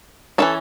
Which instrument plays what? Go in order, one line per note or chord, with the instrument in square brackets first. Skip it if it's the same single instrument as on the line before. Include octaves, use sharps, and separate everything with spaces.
[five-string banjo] E3 A3 C#4 A4